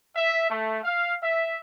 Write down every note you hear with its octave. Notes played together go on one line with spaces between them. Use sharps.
E5
A3
F5
E5